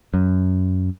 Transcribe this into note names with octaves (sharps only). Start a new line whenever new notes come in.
F#2